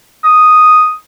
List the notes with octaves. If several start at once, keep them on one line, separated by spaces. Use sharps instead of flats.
D#6